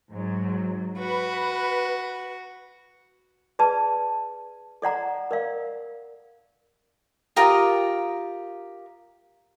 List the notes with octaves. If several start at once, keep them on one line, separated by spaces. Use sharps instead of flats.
G#2 F#3
F#4 B4
G#4 B4 D5 A5
A4 D5 F#5 A#5
A#4 D5 F5
F4 G4 A#4 D#6